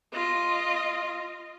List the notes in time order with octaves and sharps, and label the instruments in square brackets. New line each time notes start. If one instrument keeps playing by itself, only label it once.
[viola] F4 D#5